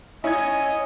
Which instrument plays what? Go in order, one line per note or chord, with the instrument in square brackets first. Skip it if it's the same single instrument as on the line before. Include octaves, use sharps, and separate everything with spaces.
[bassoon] C#4 [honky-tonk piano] E4 G#6 [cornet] D#5